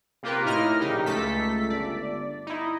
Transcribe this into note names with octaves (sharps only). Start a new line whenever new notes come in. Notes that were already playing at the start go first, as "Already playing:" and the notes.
C3 A#3 F4 G4 A#4 B4
A2 D#4 E4 A#4 D#5 F6
A#1 C#3 D#4 G4
C#2 A3 A4 B6
G1 D5
D#4 E4